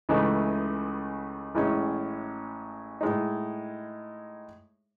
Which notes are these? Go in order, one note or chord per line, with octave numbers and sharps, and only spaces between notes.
C#2 C#3 E3 A3 D#4
A1 A2 G#3 C#4
A2 G#3 D#4